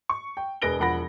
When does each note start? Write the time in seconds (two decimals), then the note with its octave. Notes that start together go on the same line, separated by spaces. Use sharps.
0.09 C#6
0.37 G5
0.62 E1 G#4 B4 A#6 D7 G7
0.79 E1 F3 F#5 B5 A#6